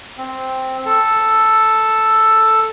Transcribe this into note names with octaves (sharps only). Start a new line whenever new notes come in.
C4
A4